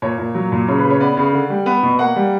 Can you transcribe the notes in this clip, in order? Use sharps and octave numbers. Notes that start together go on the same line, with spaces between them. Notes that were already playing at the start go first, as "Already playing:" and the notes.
A#2 C#5
A#2
F#3
A#2
C#3 C#5
B4
C#3
C#5
B3 D5
C#3
D3
G3
B3
B2
A#3 F#5
G3